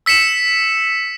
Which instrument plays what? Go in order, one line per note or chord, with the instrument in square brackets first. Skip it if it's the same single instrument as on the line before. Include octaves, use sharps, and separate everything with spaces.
[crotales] E6 B6 C#7 E7